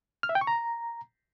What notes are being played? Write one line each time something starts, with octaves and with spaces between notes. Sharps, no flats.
F6
E5
G5
C#6
A#5